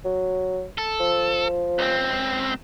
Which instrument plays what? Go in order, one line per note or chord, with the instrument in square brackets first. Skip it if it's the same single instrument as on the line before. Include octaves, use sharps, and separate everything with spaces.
[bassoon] F#3
[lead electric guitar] A4
[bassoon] F3
[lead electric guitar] C#2 C4